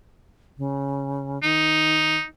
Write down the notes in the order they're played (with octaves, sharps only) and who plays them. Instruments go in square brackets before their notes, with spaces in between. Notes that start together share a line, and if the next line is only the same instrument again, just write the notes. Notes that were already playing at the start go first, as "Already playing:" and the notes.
[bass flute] C#3
[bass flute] D#3 [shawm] D#4